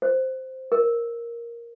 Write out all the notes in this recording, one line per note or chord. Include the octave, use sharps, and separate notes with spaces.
C5
A#4